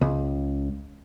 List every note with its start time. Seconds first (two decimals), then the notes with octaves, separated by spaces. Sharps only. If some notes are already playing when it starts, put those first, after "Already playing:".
0.01 C#2